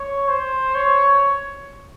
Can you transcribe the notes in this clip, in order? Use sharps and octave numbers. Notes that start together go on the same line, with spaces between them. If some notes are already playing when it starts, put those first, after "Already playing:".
Already playing: C#5
C5
C#5